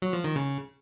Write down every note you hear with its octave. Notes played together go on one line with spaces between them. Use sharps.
F#3
F3
D#3
C#3